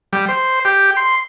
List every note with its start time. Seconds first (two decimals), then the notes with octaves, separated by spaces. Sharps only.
0.13 G3
0.29 C5
0.65 G4
0.97 C6